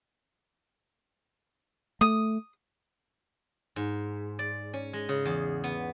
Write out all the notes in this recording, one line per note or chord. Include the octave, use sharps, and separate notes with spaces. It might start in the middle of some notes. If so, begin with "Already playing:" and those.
A3 D#6
G#2
D5
C#4
G#3
C#3
E2
B3